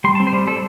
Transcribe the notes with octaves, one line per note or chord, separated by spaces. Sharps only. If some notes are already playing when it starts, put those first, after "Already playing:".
G3 C6
A5
C4
C5
G3
G3 A4